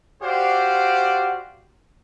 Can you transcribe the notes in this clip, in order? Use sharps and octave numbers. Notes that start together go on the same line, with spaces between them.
F#4 G4 C5 D5 F5